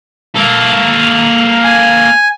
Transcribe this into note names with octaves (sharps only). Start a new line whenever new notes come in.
A#3 A4
G#5